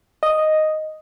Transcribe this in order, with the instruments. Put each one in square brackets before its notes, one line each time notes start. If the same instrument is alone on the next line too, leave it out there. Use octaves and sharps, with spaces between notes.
[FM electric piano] D#5